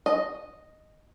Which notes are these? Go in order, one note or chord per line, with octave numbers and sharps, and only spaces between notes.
D#5